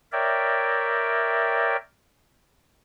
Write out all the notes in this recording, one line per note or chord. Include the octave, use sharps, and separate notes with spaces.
A#4 C#5 D5 E5 G5